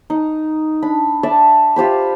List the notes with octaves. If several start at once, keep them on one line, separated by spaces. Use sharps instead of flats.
D#4
D4 B5
D5 E5 A5
F4 G4 C5 B5